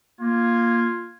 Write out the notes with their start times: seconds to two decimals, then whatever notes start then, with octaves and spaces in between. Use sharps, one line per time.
0.21 A#3 F4 G#6